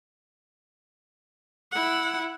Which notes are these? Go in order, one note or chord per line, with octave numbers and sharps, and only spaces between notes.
E4 F#5